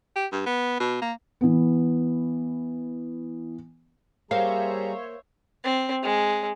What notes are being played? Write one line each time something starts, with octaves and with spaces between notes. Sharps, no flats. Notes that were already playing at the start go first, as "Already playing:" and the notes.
G4
G2
B3
B2
A#3
E3 B3
G3 A#3 G#4 C5 C#5 E5 F5 A#5
C4
G#3